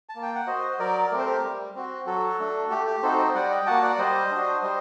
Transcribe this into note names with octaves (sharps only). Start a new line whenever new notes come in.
A5
A#3
G5
F#5
F#4 C5 D#5
C5
F#3 A#4 D5
A3 C4 A#4
C5
G4 A#4
G3
C4 F#4
F#3 F#4 A4
A3 D4
A3 G4
G4
C4 D#4 F#4 A4 C5
C5 D#5
G3 D5 F#5
D#5 G5
A#3 F#4 F#5 A5
D5 F#5
G3 C5 D#5
D4 F#4
G3 C5 D#5